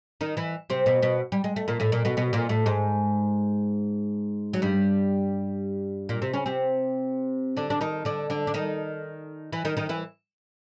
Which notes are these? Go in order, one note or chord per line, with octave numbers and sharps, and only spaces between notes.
D#3 D#4
E3 E4
C3 C4
B2 B3
B2 B3
G3
G#3
A3
A#2 A#3
A2 A3
A#2 A#3
B2 B3
B2 B3
A#2 A#3
A2 A3
G#2 G#3
F#3
G2 G3
A#2 A#3
C3 C4
C#3 C#4
C3 C4
D3 D4
D4
D#3 D#4
D3 D4
D3 D4
D4
D#3 D#4
E3 E4
D#3 D#4
D#3 D#4
E3 E4